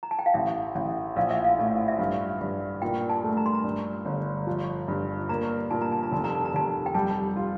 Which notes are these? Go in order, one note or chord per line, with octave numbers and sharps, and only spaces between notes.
A#5
A5
G5
F5
A1 E5
A1
A#1 F5
E5
F5
A2
E5
G2 F5
G2
A#2 G5
A5
A3
A#5
C6
A#5
G2
G1
F3
G2
A#3 A#5
A#2 A5
A#5
A5
A#5
F1 A5
A#5
A5
A#5
F1 A5
G5
G3 A5
F4